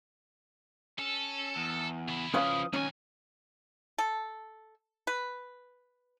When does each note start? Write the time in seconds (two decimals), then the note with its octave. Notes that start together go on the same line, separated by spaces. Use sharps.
0.99 C#4 A4
1.57 E2
2.08 C#3 E4
2.34 F3 C#4 B4 F5 D#6
2.74 C#2 D#3 F#3 C#4 G#5
3.98 A4
5.07 B4